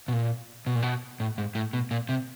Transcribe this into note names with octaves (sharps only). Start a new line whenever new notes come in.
B2
A#2
B2
A#2
B2
A2
G#2
A2
B2
A#2
C3